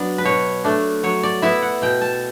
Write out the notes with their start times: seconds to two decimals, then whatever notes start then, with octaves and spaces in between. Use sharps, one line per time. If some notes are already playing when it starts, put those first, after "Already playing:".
Already playing: F#3 B3 D4 D5
0.18 B4
0.25 B2 C#5
0.64 A3 D4
1.03 F#3 C#5
1.23 D5
1.42 B3 E4 E5
1.62 F#5
1.82 B2 G5
2.01 A5